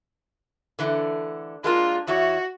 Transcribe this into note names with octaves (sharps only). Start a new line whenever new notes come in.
D3 E3 A3
G#3 A#3 D4 F4
E2 E4 F#4 C#5